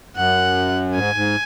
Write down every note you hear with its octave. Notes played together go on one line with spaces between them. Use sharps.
F#2 F#5
G#2 G#5
G#2